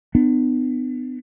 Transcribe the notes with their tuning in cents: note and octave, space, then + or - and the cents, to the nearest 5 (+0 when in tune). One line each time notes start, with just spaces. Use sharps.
B3 +30 D4 +45